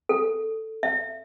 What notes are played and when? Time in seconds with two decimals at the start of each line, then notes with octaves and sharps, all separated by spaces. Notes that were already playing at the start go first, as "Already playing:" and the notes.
0.09 A4
0.83 E5